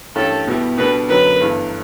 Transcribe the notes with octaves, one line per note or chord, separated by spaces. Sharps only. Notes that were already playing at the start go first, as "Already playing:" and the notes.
G2 E3 A3 C#4 G4 A4
B2 G3 B3 E4 G4
B2 G3 D4 A4 B4
F#2 D3 F#3 B4
G1 G2 E3 A3